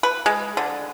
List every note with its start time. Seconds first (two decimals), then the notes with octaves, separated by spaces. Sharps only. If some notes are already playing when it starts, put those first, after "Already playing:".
0.03 B4
0.26 G#3
0.57 D3